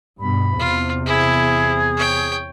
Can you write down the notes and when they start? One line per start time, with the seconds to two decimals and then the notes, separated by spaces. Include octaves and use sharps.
0.19 G2 B2 B5
0.59 E2 C3 F4
1.06 E4 G#4
1.97 C#5 G5